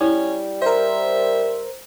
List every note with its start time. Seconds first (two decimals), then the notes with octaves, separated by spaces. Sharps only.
0.01 G3 C#4 E4
0.62 A#4 C5 E5